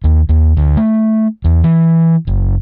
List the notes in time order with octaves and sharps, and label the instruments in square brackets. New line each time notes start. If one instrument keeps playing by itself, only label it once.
[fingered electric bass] D#2
D#2
D2
A3
E2
E3
F#1